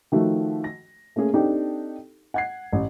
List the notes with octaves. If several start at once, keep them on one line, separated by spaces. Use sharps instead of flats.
D#3 F3 A3 F#4
A#6
A3 A#3 C#4 G#4
C4 D4 D#4 G4 A4
F#5 G#6 C7
A1